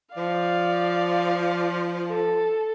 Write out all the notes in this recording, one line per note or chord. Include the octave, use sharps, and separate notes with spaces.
F3 D5 F5
A4